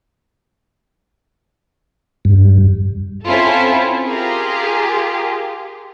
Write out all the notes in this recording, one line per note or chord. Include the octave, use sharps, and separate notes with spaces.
G2
C4 C#4 E4 F4 A4
F4 G4 G#4 A#4